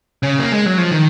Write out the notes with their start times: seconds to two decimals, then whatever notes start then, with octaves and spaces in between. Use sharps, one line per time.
0.23 C#3
0.39 A#3
0.52 G#3
0.66 F#3
0.78 F3
0.91 D#3